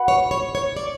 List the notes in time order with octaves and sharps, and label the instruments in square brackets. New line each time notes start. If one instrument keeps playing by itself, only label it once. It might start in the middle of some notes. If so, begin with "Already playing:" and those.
Already playing: [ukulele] F#4 B4 F#5 B5
[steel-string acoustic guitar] C#5
C#5
C#5
D5